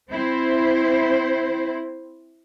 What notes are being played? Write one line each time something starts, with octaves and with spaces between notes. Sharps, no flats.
C4 E4 C5